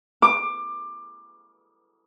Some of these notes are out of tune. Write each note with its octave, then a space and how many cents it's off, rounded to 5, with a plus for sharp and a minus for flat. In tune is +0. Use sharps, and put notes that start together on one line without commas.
D6 +20